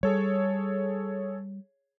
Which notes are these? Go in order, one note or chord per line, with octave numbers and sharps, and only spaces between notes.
G3 G#4 A4 C#5